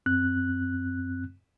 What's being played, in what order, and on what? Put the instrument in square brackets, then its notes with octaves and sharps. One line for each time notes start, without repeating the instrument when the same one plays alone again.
[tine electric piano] F#2 C4 F#6